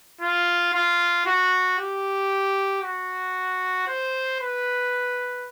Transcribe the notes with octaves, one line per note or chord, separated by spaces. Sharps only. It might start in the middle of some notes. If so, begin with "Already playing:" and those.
F4
F4
F#4
G4
F#4
C5
B4